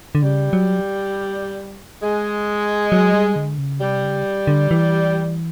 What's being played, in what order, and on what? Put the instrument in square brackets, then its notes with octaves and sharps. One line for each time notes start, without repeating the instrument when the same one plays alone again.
[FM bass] D3
[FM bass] C#3 [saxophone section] G3
[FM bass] F#3
[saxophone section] G#3
[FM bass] F#3
G3
D3
C#3
[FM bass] C3 [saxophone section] G3
[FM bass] C#3
D3
E3